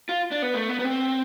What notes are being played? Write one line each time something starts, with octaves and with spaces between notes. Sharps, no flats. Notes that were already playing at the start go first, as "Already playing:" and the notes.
F4
D4
B3
A3
B3
B3
C4